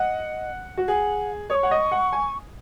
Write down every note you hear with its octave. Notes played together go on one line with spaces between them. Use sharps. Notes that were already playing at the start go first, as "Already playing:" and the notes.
Already playing: D#5 F#5
F#4
G#4 F#5
C#5 C#6 D#6
F#5
D#5
F#5
G#5